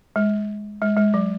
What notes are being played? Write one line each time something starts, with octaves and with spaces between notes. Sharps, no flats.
G#3
G#3
G#3
F#3